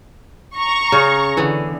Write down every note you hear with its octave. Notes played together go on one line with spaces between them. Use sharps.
A#5 C#6
C#3
D3 E3 B3